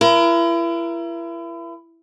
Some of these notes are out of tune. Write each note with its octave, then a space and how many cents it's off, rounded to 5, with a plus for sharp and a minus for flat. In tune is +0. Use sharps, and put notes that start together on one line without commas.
E4 +35 A#4 +30